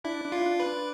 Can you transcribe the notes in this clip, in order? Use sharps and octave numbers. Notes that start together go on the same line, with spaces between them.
D4 E4
D4
F4
D4
B4
D4